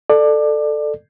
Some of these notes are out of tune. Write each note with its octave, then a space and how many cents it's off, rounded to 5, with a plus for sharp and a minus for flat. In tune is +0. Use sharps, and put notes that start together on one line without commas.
A4 +0 D5 +25